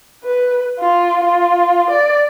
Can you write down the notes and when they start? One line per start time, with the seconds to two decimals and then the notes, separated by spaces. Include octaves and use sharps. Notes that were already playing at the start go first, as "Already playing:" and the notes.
0.23 B4
0.79 F4
1.24 F4
1.91 D5